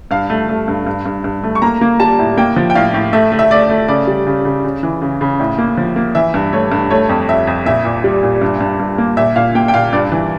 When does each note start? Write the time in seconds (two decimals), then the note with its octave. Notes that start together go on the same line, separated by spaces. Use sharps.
0.11 G2 F5
0.30 A3
0.49 A3
0.68 G2
0.87 G2
1.06 G2
1.24 G2
1.43 A3
1.55 C#6
1.62 A#3 A#5
1.81 A#3
2.00 G3 A5
2.19 A2
2.37 A#3 G5
2.56 F3
2.70 G5
2.75 A2 F5
2.94 A2
3.13 A3 E5
3.32 A3
3.39 E5
3.51 A3 D5
3.70 A3
3.88 C#3 D5
4.07 G3
4.26 C#3
4.45 C#3
4.64 C#3
4.83 E3
5.02 C#3
5.21 C#3
5.40 A2
5.58 A#3
5.78 F3
5.96 A#3
6.15 E3 E5
6.34 G2
6.53 A3 C#5
6.72 G2
6.90 A3 C#5
7.09 F2
7.29 F2 E5
7.47 F2
7.66 A#2 E5
7.85 A#2
8.04 G3
8.23 A#2
8.42 G2
8.61 G2
8.80 G2
8.98 A#3
9.17 A#2 E5
9.36 A#2 F5
9.55 A#3 G5
9.68 G5
9.74 A#2 F5
9.93 G2 D5
10.12 E3